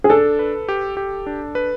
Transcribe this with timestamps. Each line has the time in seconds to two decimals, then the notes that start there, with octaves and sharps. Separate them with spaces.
0.04 G#4
0.09 D4 A4
0.39 B4
0.69 G4
0.97 G4
1.27 D4
1.55 B4